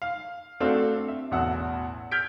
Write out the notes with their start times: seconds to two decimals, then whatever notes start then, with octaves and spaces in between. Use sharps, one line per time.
0.02 F5
0.60 A3 C4 D4 F#4 A4 F5
1.08 E5
1.31 A1 E2 B2 F#5 E6
2.11 F6 G6 G#6 B6 D7